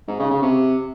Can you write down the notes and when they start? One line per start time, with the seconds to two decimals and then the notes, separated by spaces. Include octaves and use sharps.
0.08 G#2
0.19 C#3
0.31 C#3
0.42 C3